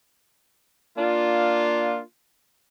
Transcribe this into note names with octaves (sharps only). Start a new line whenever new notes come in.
A#3 D4 F4